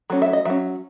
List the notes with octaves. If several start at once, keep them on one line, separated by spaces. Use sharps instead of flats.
F#3 A3 C#4
E5
D#5
F#3 C#4 E5